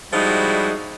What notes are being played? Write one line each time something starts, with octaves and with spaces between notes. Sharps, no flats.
F3 G3 G#3 D#4 E4 F#4